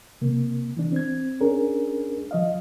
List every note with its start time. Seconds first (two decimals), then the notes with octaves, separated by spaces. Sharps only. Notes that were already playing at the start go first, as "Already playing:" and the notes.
0.21 C3 A#3
0.77 E3 D4
0.92 C4 G#6
1.41 C#4 D4 G#4 A#4
2.31 F3 D#5 F5